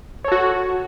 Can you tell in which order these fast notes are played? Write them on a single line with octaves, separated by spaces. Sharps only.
C#5 A4 F#4